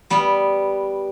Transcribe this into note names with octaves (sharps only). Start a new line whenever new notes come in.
G3 B3